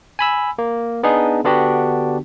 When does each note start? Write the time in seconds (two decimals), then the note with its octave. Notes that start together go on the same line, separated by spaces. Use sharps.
0.19 G#5 B5 E6
0.58 A#3
1.03 B3 D4 D#4 G#4
1.44 D3 B3 D4 F#4 G4